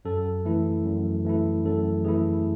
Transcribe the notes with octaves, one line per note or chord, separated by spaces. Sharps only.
F#2 A4
E3 A3 E4
F#2
E3 A3 E4
F#2 A4
E3 A3 E4 G#4